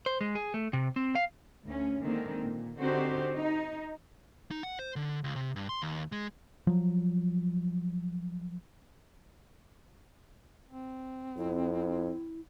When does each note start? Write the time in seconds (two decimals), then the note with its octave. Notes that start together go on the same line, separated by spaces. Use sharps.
0.06 C5
0.21 G#3
0.35 G#4
0.54 A3
0.73 C3
0.96 C4
1.15 F5
1.65 D2 C#4
2.02 D3 D#3 G#3 A#3 C4
2.42 A#2
2.79 D3 C4 D#4 F#4 G4 C5
3.35 D#4
4.51 D#4
4.63 F#5
4.79 C5
4.96 D3
5.24 C#2
5.36 C3
5.56 G2
5.69 C6
5.82 D#2
6.12 G#3
6.67 F3 F#3
10.70 C4
11.37 F2 E4